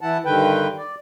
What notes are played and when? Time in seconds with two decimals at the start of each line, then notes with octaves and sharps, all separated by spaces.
0.01 E3 E4 F#5 A5
0.25 G2 D3 D#3 B4 G5
0.78 D5